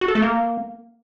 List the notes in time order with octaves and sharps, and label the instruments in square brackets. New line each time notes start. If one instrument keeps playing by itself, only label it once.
[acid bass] F#4
A4
A3
A#3